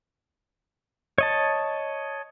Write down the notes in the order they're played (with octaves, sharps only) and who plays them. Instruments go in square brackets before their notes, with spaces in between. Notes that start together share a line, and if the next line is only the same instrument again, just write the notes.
[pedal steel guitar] C#5 D#5 A5